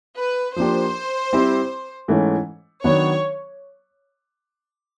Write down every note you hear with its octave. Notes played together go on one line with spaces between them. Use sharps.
B4
F3 A#3 D4 G4 C5
G3 C4 E4 G4
G#2 E3 A3 C#4
D#3 F#3 B3 D4 F#4 C#5